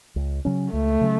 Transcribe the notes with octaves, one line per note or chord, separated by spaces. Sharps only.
C#2
C#3 F#3 C#4
C#2 A3
C#3 F#3 C#4